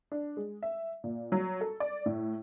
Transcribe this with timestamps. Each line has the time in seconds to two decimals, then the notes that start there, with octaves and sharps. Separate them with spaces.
0.12 D4
0.37 G#3
0.63 E5
1.04 A#2
1.32 F#3
1.61 A4
1.80 D5
2.06 A2